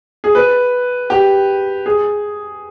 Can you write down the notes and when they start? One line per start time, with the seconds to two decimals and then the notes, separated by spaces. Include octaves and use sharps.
0.24 G#4
0.35 B4
1.10 G4
1.86 G#4